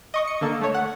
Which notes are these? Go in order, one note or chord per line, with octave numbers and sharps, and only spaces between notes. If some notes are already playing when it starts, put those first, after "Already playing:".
D#5 C#6 D#6
C#7
D3 A#3 A4
A3 C#5
F#5